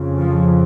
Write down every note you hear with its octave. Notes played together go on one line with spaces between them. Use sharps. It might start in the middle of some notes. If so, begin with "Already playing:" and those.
Already playing: F2 C#3
F3